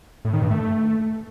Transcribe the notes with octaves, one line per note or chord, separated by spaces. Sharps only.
A2
D#3
G2
A3